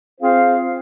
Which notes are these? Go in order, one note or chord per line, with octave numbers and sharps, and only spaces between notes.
C4 F4 G#4 C5 F5